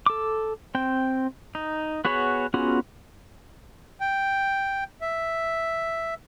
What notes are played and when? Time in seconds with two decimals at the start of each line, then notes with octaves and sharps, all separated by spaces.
0.06 A4 D6
0.75 C4 G5
1.55 D#4
2.05 B3 F#4 G#4 C#5 B5
2.54 B3 C#4 F4 F#4 G#4
4.01 G5
5.01 E5